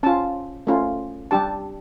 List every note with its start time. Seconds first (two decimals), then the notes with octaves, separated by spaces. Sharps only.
0.03 C#4 F4 A5
0.67 A3 C#4 F4
1.31 G3 D4 G4 A5